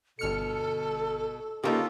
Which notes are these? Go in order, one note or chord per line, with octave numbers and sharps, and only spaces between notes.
G1 B2 A4 F6 C#7
C#3 A#3 D#4 F4 G4 A4